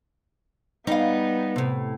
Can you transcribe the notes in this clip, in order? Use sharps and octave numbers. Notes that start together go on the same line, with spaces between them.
G3 B3 D#4 F5
A2 C3